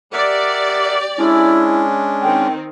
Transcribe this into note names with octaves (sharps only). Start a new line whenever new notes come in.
G4 A#4 D5 E5 F#5
G#3 C#4 D4 E4
D#3 C4 G5